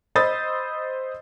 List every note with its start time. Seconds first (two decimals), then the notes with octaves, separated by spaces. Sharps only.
0.15 C5 D#5 B5 D#6 E6 A6